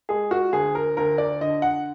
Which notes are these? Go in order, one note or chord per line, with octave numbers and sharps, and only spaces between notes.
G#3 G#4
F#4
D2 G#4
A#4
D2 A#4
D5
D3 D#5
F#5